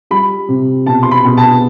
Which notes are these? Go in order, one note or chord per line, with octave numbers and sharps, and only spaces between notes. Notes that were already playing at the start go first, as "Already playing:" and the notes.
G3 B5
C3
B2 A5
C6
B5
B2
A5